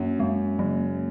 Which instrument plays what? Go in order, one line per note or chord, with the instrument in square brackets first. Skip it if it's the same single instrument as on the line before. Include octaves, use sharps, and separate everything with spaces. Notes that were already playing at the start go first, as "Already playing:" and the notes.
Already playing: [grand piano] F#2 F#3 [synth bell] A#3
[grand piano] F#2 [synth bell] G#3
[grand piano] C#3 [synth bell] F#3